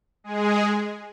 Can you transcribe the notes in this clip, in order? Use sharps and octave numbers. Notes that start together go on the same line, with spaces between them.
G#3 G#4